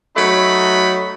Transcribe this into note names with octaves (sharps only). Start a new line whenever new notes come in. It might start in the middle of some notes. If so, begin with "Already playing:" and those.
F#3 A3 D#4 B5